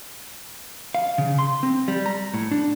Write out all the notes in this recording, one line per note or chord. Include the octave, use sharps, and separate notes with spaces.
F5
C#3
C6
C4
G3
A#5
A2
D4